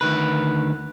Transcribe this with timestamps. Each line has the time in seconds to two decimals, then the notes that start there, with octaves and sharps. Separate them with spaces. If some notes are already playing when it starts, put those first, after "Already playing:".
0.01 D2 D#3 B4